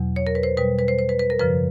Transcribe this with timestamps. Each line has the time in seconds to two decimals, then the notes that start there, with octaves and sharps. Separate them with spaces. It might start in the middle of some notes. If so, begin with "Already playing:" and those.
Already playing: E2 B2 F#3
0.16 C#5
0.27 A#4
0.35 B4
0.43 C5
0.57 B2 G3 B4
0.79 B4
0.88 C5
0.99 C5
1.09 B4
1.19 B4
1.30 A#4
1.39 F#2 C#3 F3 B4